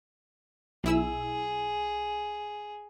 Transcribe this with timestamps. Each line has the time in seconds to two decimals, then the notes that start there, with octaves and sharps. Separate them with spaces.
0.84 B1 E4 G#4 E6